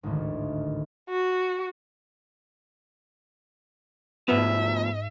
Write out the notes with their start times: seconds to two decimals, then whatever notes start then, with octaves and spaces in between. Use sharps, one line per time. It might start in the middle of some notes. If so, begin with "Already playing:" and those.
0.03 G#1 D2 A2 D3 D#3
1.10 F#4
4.28 D2 G#2 B2 F3 B3 E5 F6